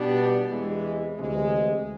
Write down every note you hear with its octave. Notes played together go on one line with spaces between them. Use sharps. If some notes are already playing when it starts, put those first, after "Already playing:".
Already playing: B2 G3 B3 D4 G4
E2 C3 E3 G#3
D2 C3 E3 G#3